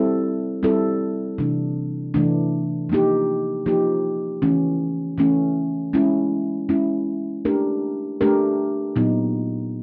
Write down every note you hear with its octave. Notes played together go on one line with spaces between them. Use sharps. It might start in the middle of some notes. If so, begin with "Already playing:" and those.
Already playing: G3 C4 E4 A4
G3 C4 E4 A4
C3 E3 A3 D4
C3 E3 A3 D4
F3 A#3 D#4 G4
F3 A#3 D#4 G4
E3 A3 C#4
E3 A3 C#4
G#3 C#4 E4
G#3 C#4 E4
A3 D4 G4 A#4
A3 D4 G4 A#4
A#2 F#3 B3 D#4